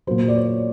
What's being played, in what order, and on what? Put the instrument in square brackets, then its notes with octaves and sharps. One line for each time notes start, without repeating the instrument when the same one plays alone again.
[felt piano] A#2 F#3 C5
D5
C#5